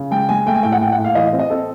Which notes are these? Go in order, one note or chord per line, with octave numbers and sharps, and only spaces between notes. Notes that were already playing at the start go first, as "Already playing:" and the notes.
Already playing: C#3
G#3 G5
G#3 G#5
A3 G5
G#5
A2 G5
F#5
A2 G5
F#5
A2
F5
E3 D#5
C4
D#5
C4 A4